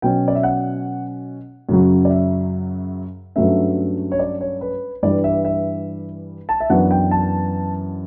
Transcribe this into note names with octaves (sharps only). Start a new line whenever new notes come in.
B2 F#3 C#4 G5
D5
E5
F#5
F#2 C#3 F#3
D5
E5
G2 F#3 A3 C#4 E5
C#5
D5
C#5
B4
G2 E3 G3 D5
E5
E5
A5
E5
F#2 E3 B3 D4 F#5
G5
A5